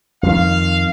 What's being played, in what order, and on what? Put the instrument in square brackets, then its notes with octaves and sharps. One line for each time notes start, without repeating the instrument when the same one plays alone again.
[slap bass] F2 D#3 [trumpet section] F5